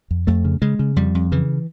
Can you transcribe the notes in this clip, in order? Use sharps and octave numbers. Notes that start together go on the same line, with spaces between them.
F2
F2 A3
C#3
C#3 G#3
C#3
F2 G3
F2
C#3 E3